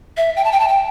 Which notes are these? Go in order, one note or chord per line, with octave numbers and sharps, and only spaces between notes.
E5
G5
A5
G5
A5
G5